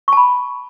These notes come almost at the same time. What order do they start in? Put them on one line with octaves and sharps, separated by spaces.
C#6 A5 B5